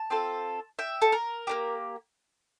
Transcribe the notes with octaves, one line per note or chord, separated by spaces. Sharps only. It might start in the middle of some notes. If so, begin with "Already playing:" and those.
Already playing: A5
C4 F4 A4
E5 G5
A4
A#4
A#3 D4 G4